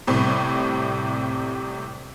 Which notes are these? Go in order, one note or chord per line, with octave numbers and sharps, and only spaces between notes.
C2 A2 C3